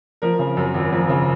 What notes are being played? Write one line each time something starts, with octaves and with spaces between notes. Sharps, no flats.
F3 A#4
C#3
F#2
G#1
F3
C#3